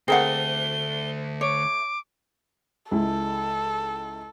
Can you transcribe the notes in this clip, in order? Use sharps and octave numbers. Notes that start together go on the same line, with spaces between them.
D2 A3 A#3 C4 G#4 F#5 G7
C#5 D6
C#2 G#3 E4 A4